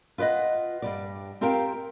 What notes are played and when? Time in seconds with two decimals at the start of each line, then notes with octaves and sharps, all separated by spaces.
0.18 F4 B4 D5 D#5 F#5
0.82 G2 G3 D5
1.41 C4 F4 G4 A#4 F5 G5